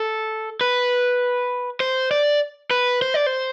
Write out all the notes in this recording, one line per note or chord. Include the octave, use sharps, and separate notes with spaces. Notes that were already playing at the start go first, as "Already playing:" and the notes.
Already playing: A4
B4
C5
D5
B4
C5
D5
C5